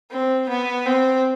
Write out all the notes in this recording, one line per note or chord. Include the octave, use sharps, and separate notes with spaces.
C4
B3
C4